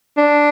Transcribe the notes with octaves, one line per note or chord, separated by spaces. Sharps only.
D4